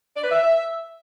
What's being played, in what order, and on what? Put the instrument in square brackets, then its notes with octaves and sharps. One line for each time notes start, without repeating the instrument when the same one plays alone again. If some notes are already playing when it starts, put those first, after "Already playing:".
[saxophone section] D5
B4
E5